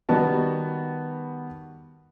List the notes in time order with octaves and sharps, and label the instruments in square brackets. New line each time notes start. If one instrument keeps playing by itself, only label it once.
[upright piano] D#3 G3 B3 F#4 A5